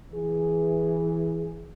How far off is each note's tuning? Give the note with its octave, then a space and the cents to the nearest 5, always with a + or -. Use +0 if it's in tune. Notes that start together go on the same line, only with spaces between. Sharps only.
E3 +0 G#4 +0